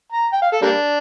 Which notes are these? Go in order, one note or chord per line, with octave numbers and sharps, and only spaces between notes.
A#5
G5
F5
A4
G3 A#3 D4